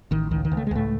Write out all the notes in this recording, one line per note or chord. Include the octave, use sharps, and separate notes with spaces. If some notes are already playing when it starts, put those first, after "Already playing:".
A1 D#3
C#2 D#3
D#3
C#2
A3
G#3
C#2 A2 A3